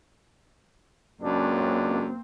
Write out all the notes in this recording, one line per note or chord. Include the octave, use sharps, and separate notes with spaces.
C#2 F#2 A#3 C4 D4